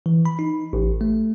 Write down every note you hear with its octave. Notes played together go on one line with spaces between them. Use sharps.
E3
B5
D#4
A1
A3